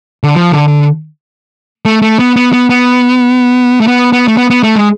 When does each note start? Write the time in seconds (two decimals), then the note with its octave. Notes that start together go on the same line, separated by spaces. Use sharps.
0.24 D3
0.35 F3
0.52 D3
0.68 D3
1.85 A3
2.02 A3
2.19 B3
2.36 B3
2.53 B3
2.70 B3
3.80 A3
3.87 B3
4.13 B3
4.28 A3
4.37 B3
4.50 B3
4.63 A3
4.76 G#3